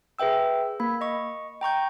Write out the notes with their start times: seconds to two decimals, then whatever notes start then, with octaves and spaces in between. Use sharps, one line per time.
0.19 G#4 B4 E5 G5 E6
0.80 A#3 B5
1.01 D#5 C#6
1.61 G5 A#5 C#6 G6